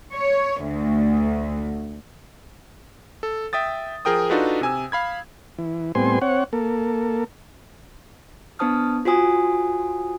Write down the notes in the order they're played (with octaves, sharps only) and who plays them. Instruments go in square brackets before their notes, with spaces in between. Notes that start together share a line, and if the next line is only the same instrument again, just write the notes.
[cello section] C#5
D2
[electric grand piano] A4
E5 G5 D#6 A6
F3 G#4 A#4 G5 D#6
D4 D#4 F4 F#4 A4 B4
C3 G#5 E6
F5 B5 G#6
[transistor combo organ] E3
A2 G3 B3 C4 G#5 C6
C4 C#5 F#5
A#3 A4
[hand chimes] B3 D4 C5 A5 D#6 F6
F4 F#4 C5 G#5 D#6